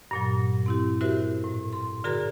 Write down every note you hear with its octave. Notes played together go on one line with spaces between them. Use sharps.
G2 A#2 F#3
C4 E4 G4
E4 F#4 G4 A#4 C5 E5
A2
C6
D3 F#4 G#4 A#4 A#5